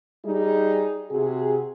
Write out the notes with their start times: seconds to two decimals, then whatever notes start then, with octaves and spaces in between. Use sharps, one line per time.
0.24 G3 D#4 G#4
1.10 C3 F#4 G#4